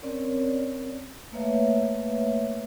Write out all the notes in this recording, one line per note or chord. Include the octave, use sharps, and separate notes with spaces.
C4 C#4 A#4 C#5 D5
A3 A#3 B4 C#5 E5 F5